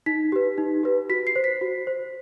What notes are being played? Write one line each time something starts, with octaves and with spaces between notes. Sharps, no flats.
D#4 B6
G4 B4
D#4
G4 B4
F#4 B6
C7
C5
B6
F#4
C5